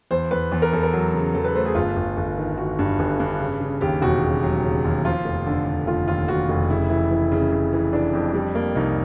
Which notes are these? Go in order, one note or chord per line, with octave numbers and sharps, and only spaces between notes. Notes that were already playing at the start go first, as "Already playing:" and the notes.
E2 C5
E2 B4
E2
A#4
E2 A4
A#4
F#3
C#3
E2 A4
B4
A3 C5
G#4
G1 F4
G1
G1
D#3
D#3 F#4
G2
G1
G2
C#3
C#3
D#2 G4
E1 F#4
C#3
F#3
C#3
D#2
F3 F4
F1
D3
D3
F1 F4
D#2 F4
D#2 F#4
F1
C#3 E4
E3 E4
E3
C#3
C#3
E3
E3 D4
F2
G3
A#3
C2 D#4